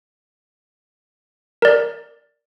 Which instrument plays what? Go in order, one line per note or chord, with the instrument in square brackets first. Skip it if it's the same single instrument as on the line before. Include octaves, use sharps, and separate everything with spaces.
[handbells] A#4 D5